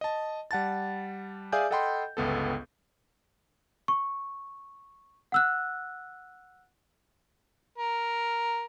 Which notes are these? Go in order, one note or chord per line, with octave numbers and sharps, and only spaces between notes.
D#5 A5
G3 F#5 A5 A6
G#4 D5 E5 F5 G#5 G6
A4 D#5 F#5 G5 B5 C6
G1 C#2 B3 A4
C#6
F#5 E6 F#6
A#4